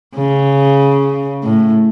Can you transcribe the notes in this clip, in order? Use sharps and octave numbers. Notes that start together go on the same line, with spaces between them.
C#3
A2